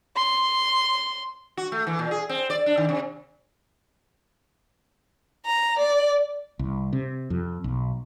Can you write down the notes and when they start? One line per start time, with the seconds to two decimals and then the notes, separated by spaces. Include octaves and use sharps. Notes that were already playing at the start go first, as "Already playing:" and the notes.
0.16 C6
1.57 F#4
1.72 A3
1.87 E3
1.99 A#2
2.11 G#4
2.29 C4
2.50 D5
2.66 D4
2.77 D#3
2.89 C3
5.45 A#5
5.79 D5
6.59 C2
6.93 C3
7.30 F2
7.64 B1